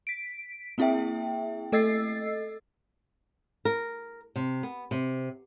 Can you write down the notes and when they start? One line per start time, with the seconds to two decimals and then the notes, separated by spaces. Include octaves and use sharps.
0.07 B6 D7
0.78 A#3 C4 E4 G#4 E5 G5
1.72 A3 A4 D#5 E6 A6 C7
3.65 A#4
4.36 C3
4.63 B3
4.91 C3